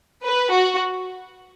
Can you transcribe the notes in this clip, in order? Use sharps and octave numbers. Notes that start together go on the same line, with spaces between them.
B4
F#4